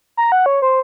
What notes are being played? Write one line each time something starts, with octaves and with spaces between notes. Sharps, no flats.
A#5
F#5
C#5
C5